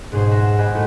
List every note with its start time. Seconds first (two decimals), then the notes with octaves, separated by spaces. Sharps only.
0.12 G#2 B2 C#4 G#4 C5 C7
0.31 E5 F#5 A#5
0.46 E7
0.58 G4 C5 D#5 F#5 G#5 B5
0.73 A2 A3 E4 F#4